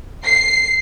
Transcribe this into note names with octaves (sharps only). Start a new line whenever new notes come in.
C7